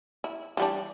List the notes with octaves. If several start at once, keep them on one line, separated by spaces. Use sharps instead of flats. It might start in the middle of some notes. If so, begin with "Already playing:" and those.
E4
E3 G3 D4